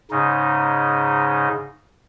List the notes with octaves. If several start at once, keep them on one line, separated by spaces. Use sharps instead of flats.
G#2 C#3 D#4